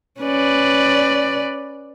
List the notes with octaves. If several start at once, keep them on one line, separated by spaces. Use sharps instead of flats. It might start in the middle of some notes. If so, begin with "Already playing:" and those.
C#4 B4 D5